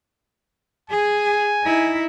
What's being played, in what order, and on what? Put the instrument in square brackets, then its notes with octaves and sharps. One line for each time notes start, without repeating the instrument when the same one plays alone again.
[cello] G#4 [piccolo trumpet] G#5
[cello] D#4 E4